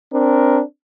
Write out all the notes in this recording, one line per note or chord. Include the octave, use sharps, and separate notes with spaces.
C4 D4 A#4